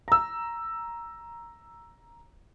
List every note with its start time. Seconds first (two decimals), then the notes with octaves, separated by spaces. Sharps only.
0.08 A#5 E6